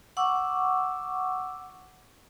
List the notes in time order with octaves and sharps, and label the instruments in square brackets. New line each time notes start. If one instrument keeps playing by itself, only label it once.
[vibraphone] F#5 C#6 D6 E6